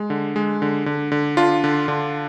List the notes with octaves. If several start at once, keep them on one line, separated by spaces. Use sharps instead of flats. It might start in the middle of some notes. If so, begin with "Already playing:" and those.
Already playing: G#3
D3
G#3
D3
D3
D3
D3 D4 F4
D3
D3